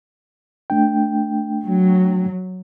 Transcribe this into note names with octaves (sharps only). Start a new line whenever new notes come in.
A3 D4 G5
F#3